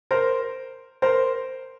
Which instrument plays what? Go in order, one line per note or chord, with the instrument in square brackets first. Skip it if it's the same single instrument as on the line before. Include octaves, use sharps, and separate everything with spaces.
[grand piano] A#4 C5
A#4 C5